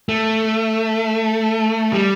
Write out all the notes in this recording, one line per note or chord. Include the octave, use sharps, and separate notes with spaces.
A3
G3